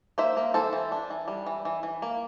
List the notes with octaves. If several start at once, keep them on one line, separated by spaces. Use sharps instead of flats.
A#3 C5 E5
A#3
E3 A4 C5
E3
D4
E3
G3
E3
E3
E3
A#3